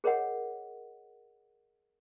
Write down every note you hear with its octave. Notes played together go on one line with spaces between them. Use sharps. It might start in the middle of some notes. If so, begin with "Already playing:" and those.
G#4 A#4 C#5 D#5 F#5